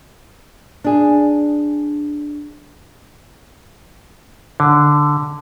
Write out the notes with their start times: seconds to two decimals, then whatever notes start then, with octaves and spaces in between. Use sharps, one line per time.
0.84 D4 G#4
4.60 D3